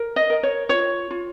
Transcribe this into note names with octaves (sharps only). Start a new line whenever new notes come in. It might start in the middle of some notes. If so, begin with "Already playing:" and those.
Already playing: A#4
D#5
A#4
C#5
F4 C#5
F4